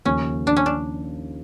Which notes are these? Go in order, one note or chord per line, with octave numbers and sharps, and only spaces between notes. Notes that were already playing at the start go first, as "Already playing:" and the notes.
D#2 C#3 F3 A#3 C#4
D4
C#4
D4